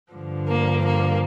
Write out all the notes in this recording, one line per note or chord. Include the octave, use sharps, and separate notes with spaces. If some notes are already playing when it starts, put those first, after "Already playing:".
G2 D3 F3
A#3
A#3